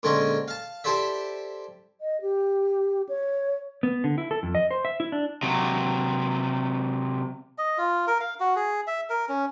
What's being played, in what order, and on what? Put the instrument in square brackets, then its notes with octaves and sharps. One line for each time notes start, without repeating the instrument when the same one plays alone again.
[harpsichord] A#2 D3 G#3 C4 C#4
F5 A5
E4 G4 A4 C5 D5 E5
[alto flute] D#5
G4
C#5
[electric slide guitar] B3
D3
E4
A4
F2
D#5
C5
E5
E4
D4
[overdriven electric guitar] C3 F#3
[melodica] D#5
F4
A#4
F5
F#4
G#4
E5
A#4
C#4